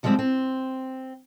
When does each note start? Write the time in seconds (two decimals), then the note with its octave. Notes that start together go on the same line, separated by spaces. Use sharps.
0.03 C#3 F3 G3 G#3 C4
0.19 C4